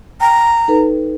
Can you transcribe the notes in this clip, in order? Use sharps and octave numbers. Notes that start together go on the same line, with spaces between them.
G5 A#5
D#4 A4 B4